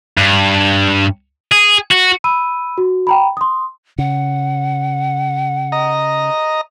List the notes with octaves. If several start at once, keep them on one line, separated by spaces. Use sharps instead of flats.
G2
G#4
F#4
B5 E6 D#7
F#4
G5 A#5 B5
C6 D#6
C#3 F#5
D#5 A#5